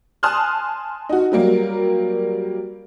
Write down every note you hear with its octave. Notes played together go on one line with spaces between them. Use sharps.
G#5 A5 C6 D#6 F6 F#6
D#4 F#4
F#3 G3 A#3 A#4